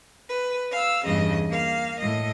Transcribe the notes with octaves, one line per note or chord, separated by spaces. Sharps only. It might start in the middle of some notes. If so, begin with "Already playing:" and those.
B4
F5 E6
E2 G2 C#3 D#5
A#3 F5
A2 D#5